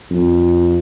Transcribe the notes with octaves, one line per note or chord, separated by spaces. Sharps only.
F2